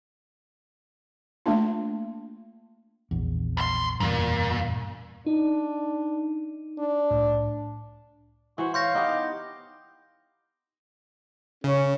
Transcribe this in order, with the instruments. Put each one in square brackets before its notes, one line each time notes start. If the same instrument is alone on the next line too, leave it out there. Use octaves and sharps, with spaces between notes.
[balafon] A3 A#3 D4 F4
[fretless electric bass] A#1 E2
[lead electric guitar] C2 C6
[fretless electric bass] F#1 E2 G2 [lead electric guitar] A#2
[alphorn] D4 [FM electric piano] D#4
[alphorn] D4
[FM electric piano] C2 A2
[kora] E3 C5 [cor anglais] F#4
[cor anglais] C#5 [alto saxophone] F5 [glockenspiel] C6 G6 A#6
[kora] B3 D#4 [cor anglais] G4
[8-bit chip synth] C#3 [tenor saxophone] C#4